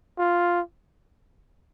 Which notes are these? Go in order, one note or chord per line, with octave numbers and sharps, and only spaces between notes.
F4